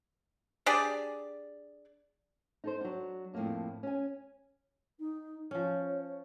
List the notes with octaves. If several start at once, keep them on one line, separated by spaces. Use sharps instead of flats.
D4 G4 G#4 D5
D#4 A4 C5
F#3 D4
F2 A2 C#3 A#3 D4
C#4 G#5
D#4
F3 C#4 C#5